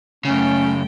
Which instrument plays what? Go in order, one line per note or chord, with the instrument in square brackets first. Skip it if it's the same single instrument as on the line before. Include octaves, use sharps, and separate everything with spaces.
[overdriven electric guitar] F#2 C#3 [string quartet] A3 G5 [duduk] C#4